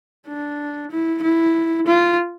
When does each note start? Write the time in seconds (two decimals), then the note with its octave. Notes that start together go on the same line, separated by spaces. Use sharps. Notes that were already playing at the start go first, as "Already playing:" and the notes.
0.28 D4
0.91 E4
1.23 E4
1.87 F4